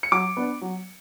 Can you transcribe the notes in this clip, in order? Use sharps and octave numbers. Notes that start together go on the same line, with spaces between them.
C#7
F#3 D6 D7
B3 D4
F#3